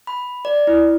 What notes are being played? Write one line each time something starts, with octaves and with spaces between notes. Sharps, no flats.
B5
D5
E4